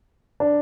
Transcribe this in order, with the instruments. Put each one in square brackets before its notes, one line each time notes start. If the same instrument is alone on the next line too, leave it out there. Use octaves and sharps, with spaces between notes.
[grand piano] D4